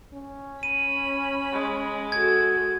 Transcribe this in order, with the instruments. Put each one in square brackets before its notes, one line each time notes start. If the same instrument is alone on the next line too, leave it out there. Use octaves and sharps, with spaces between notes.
[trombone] C#4
[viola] B5 [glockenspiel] D#7
[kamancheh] G#3
[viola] F#4 A4 [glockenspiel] G#6